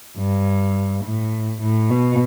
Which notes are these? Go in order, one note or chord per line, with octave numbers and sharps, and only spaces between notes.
G2
A2
A2
B2